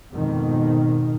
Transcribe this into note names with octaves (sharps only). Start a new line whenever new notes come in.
F2 G#2 B2 D#3